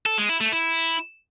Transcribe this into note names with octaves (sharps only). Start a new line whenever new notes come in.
A4
G#3
E4
A3
E4